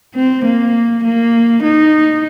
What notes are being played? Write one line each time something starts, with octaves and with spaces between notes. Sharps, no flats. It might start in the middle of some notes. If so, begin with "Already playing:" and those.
C4
A#3
A#3
D#4